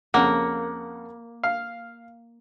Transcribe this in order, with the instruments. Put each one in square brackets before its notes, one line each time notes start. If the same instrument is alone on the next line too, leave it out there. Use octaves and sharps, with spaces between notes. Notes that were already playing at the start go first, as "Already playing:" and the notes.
[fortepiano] F2 C#3 F#5 [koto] A#3
[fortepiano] F5